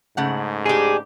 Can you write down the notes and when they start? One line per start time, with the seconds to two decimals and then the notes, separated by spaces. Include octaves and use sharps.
0.17 G#2 C#3 A3 F#5
0.66 D4 G4 G#4